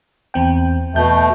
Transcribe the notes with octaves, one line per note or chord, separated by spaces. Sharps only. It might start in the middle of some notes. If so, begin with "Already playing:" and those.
E2 C4 G5
E2 B2 A3 G6